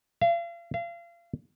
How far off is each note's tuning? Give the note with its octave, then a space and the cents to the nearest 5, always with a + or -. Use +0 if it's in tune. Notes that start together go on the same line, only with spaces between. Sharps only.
F5 -40
F5 -35